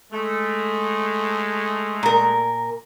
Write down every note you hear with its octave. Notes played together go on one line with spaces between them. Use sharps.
G#3 A3
A#2 A#4